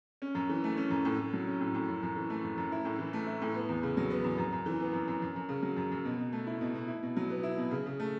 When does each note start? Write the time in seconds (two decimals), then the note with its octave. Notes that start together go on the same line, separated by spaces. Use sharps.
0.22 C#4
0.35 F#2
0.49 E3
0.64 A3
0.77 C#4
0.90 F#2
1.05 A2
1.19 A2
1.33 F#3
1.47 C#4
1.60 A2
1.75 A2
1.89 F#2
2.03 F#2
2.16 E3
2.30 A3
2.43 F#2
2.58 F#2
2.72 E4
2.85 A2
2.99 E3
3.13 A3
3.27 E4
3.42 A2
3.54 B3
3.69 E2
3.83 C#3
3.97 F#3
4.10 B3
4.24 E2
4.38 F#2
4.52 F#2
4.66 E3
4.80 B3
4.93 F#2
5.08 F#2
5.22 F#2
5.36 F#2
5.49 C#3
5.63 F#3
5.77 F#2
5.92 F#2
6.05 B2
6.18 B2
6.32 A3
6.47 E4
6.61 B2
6.75 B2
6.88 E4
7.03 B2
7.17 F#3
7.30 B3
7.43 E4
7.58 B2
7.71 C#3
7.86 C#3
8.00 A3